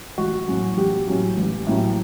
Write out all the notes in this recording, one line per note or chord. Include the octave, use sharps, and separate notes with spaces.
A1 F#4
A2 F#3 A#3 C#4
A1 G4
A2 F#3 A#3 C#4
A1
A2 F#3 A#3 C#4